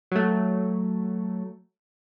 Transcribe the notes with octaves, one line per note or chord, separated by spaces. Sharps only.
F#3 A3